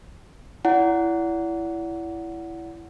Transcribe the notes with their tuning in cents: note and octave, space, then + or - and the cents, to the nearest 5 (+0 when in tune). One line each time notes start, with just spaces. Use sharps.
E4 +15 D5 -40 F#5 +0